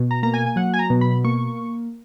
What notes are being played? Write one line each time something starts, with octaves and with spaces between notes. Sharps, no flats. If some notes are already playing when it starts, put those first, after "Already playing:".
Already playing: B2
A#5
A#3 A#5
G#5
G#5
F#3 F#5
G#5
A#5
B2
B5
A#3 C#6